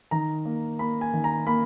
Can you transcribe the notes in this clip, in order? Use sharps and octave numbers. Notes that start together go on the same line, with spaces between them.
D#3 A#5
A#3
A#3 B5
G#5
D#3
A#5
A#3 B5